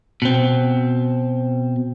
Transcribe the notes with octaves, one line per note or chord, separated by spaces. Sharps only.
B2 C4